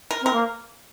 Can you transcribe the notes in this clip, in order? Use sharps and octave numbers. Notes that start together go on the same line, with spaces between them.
A#4
C4 A#4
A#3